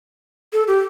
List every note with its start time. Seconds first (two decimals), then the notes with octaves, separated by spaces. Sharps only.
0.53 A4
0.68 G4